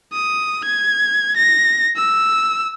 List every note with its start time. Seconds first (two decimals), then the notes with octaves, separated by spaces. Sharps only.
0.13 D#6
0.64 G#6
1.37 A#6
1.96 E6